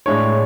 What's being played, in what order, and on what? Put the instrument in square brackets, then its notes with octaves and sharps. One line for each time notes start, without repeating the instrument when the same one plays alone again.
[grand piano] A2 G#3 D4 C#5